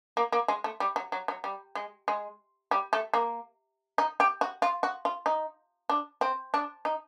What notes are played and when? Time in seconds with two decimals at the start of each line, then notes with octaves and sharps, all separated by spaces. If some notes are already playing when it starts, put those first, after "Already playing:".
0.17 A#3
0.32 A#3
0.48 G#3
0.64 A3
0.80 G3
0.96 F#3
1.12 F#3
1.28 F#3
1.44 G3
1.75 G#3
2.08 G#3
2.71 G3
2.93 A3
3.14 A#3
3.98 D#4
4.20 G4
4.41 F#4
4.62 F4
4.83 F#4
5.05 F4
5.26 D#4
5.89 D4
6.21 C4
6.54 D4
6.85 D#4